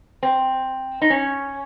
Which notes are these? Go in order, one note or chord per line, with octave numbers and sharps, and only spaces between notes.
C4
D#4
C#4